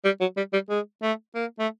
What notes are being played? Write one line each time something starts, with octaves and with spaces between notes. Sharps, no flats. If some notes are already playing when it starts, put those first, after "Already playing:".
G3
F#3
G3
G3
G#3
A3
A#3
A3